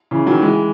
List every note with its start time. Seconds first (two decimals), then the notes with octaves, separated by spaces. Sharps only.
0.11 C#3 E3
0.26 D#3 F#3
0.42 E3 G#3